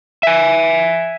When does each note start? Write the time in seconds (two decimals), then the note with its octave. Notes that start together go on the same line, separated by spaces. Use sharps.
0.23 E5 G#5